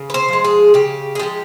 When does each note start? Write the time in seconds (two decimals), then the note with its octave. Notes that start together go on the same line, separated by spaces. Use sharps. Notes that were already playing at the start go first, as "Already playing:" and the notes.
Already playing: C#3
0.10 B4
0.14 C5
0.28 F3 G#3
0.44 G#4
0.74 C#3 G4
1.15 G#4
1.19 F3 G#3 G4